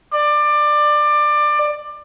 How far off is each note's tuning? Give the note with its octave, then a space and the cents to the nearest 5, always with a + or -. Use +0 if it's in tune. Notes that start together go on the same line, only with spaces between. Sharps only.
D5 +20